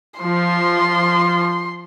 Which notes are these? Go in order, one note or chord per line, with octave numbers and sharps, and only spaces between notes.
F3 C6